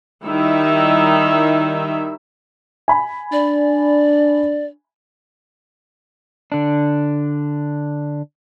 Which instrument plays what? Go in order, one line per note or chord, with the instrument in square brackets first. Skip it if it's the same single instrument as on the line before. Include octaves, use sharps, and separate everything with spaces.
[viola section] D#3 G3 D#4 E4 E5
[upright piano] G#5 B5
[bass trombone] D4 [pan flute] D5
[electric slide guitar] D3 D4